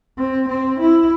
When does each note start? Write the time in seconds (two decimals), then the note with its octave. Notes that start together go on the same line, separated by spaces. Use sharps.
0.18 C4
0.49 C4
0.80 E4